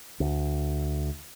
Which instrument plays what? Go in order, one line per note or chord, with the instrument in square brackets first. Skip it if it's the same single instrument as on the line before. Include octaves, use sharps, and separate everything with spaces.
[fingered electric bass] D2